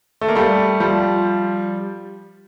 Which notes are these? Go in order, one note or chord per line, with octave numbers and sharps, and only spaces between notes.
A3
A#3
G3 A3
F3 G3